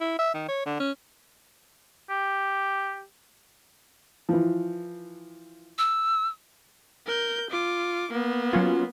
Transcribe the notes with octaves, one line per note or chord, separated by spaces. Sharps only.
E4
E5
D#3
C#5
D3
C#4
G4
E3 F3
E6
A#4 G6
F4 D6
A#3 B3
F#3 C#4 F4